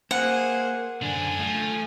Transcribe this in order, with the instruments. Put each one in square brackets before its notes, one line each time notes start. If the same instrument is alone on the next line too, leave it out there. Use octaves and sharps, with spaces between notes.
[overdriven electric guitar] A#3 [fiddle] G#4 C5 [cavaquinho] F#5
[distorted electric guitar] F#2 D4 [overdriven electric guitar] D3 [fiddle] G#5
[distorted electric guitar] F3 [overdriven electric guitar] A3